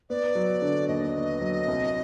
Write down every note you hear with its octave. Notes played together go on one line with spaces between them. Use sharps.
B3 D5
F#3
D3
D#2 D#5
B3
F#3
C2